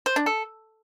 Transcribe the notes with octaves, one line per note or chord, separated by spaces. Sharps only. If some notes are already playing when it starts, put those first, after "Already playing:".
C5
D4
A4